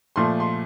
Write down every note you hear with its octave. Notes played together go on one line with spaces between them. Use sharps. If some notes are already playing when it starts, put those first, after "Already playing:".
A#2 F3 A3 C6
C6